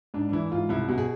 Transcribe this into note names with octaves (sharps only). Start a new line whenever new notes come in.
G#2 D4
D4
E3 E4
G#2 F4
C2 E4
B2
G#4